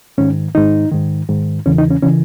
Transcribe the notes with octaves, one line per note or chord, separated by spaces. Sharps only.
G#2 D#3 C#4
G#2 D#3 D#4
G#2 D#3
G#2 D#3
E2 C#3 E3 C#4
D#4
C#4
C#3 E3 C#4